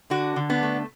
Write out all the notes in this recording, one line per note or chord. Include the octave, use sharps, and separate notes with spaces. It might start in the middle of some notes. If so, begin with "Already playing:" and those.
D3 D4 F#4
D3
B3 D4
A3